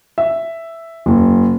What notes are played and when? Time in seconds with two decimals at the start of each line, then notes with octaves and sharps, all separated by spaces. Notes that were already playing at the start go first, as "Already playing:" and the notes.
0.18 E5
1.06 F#1